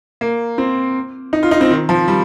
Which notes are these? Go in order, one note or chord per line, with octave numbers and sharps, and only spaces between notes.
A#3
C4
D#4
F4
D#4
C4
D#3
F3
G3